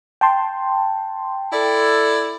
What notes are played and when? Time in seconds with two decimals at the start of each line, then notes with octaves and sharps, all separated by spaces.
0.21 G5 A5 C6
1.52 E4 A4 D5